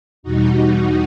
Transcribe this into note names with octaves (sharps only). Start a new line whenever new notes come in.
E2 B2 G3 D#4 F#4